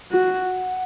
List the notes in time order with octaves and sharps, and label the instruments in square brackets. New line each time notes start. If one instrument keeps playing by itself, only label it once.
[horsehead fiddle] F#4 [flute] F#5